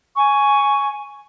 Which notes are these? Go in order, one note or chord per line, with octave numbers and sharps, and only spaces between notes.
G#5 C#6